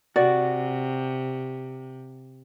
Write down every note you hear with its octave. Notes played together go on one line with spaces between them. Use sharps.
C3 F#4 D5